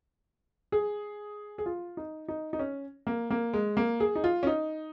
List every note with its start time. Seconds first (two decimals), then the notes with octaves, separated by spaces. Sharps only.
0.72 G#4
1.58 G#4
1.66 F4
1.97 D#4
2.28 D#4
2.53 D#4
2.59 C#4
3.07 A#3
3.30 A#3
3.53 G#3
3.77 A#3
4.00 G#4
4.15 D#4
4.24 F4
4.43 C#4
4.47 D#4